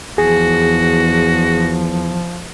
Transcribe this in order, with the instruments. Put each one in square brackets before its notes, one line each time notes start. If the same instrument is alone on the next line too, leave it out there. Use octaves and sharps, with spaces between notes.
[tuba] E2 [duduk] F3 [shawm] F#4 [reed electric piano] G#4